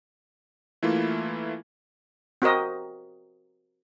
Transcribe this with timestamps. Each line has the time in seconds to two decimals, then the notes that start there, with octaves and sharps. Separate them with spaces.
0.83 E3 A3 A#3 E4 F4
2.42 C4 F#4 A#4 D#5